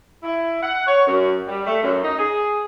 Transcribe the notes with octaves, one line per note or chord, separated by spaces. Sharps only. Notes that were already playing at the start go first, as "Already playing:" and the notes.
E4
F#5
C#5
F#2
G3
A3
F#2
D#4
G#4